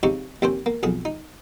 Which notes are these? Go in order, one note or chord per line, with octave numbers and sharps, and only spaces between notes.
C#3 C4 D#4 G4 C#6
D#2 C4 C#4 C5
A#3
B1 F2 G#4 D#6
D#4